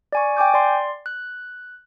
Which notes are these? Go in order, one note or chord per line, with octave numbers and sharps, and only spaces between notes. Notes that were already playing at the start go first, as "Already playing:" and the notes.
D5 G#5 C#6
G5 G#5 D6 G6
D5 C6
F#6